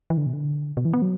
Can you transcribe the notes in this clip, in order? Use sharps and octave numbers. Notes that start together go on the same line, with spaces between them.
E3
D3
B2
D3
B2
E3
B3
F#3